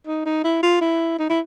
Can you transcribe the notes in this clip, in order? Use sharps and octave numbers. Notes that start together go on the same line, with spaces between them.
D#4
D#4
E4
F4
E4
D#4
E4